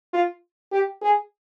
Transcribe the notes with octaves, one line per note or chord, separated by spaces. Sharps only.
F4
G4
G#4